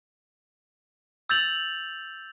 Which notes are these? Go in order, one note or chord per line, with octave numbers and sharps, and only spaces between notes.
E6 G6 A6 F7 F#7